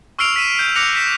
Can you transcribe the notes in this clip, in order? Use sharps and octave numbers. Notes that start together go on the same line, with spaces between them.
C#6 E6 F6 C7 D7 F7
B6 D#7 E7
G6
D6 F#6 A#6 C#7 F7
B6 E7